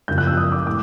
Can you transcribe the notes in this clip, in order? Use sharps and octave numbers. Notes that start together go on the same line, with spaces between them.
F#2 C#3 F3 G6
F#6
E6
D#6
D6
A2 D6